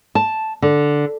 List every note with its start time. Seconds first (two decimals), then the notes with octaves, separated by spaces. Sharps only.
0.15 A5
0.62 D3